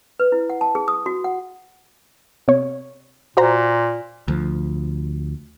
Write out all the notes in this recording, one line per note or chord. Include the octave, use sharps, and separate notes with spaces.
B4
E4
F#5
A5
G#4
D#6
F#4
F#5
C3 C#5
A#2 F#4 C5 A#5
D2 F3